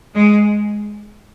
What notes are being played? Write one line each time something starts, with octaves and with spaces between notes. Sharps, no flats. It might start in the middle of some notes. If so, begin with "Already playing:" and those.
G#3